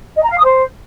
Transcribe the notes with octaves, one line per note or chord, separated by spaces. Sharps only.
D#5
A#5
F5
D#6
C5